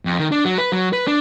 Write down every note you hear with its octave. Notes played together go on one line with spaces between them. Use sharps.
F2
D#3
D4
F#3
B4
F#3
B4
D4